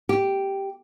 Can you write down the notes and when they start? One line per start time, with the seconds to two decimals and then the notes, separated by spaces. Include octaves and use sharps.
0.09 G4